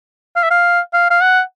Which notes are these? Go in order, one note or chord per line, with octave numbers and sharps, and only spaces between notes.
F5
E5
F5
F5
F5
F#5